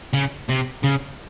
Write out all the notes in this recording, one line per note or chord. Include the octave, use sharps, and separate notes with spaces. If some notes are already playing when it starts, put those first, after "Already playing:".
C#3
C3
C#3